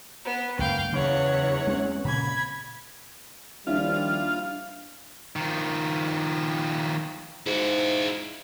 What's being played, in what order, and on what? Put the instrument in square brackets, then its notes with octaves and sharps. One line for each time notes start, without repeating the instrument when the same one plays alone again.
[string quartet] B3
[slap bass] C#2 F#2 A#3 [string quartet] F5 G5
[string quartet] E2 C#5 F#5 [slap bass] C#3 F#3
[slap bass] G#3 C4 C#4
[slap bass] A#2 C#3 [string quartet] B5 G#6
[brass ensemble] D#2 F3 G3 [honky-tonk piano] D4 E4 [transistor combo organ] F4
[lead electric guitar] D#3 F3
[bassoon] G#2 [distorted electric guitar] E4 F#4